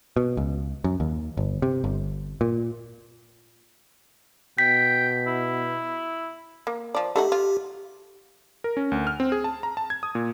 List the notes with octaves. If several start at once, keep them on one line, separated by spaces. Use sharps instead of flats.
B2
C#2
F#2
D#2
G1
C3
G1
A#2
B2 G5 B6
E4
A#3
F3 D5
A3 D#4 F#4 G4
F4
A#4
C#4
D2
F6
C4
G#4
A5
A#5
A5
G#6
D#6
A#2